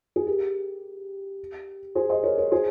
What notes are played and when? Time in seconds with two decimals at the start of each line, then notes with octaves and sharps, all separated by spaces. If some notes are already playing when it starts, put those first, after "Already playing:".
0.16 G#4
0.27 G4 A#4
1.95 G#4 C5
2.10 C5 D#5
2.23 A#4 C#5
2.38 A#4 C#5
2.51 G#4 C5